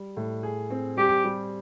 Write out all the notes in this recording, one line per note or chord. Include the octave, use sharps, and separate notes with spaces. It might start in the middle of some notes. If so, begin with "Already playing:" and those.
Already playing: G3
A2
G#4
C4
G3 G4
G3